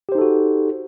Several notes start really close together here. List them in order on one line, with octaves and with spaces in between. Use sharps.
G4 C5 D#4 A4 F#4